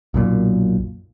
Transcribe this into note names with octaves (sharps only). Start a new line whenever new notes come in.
B1 F#2 A#2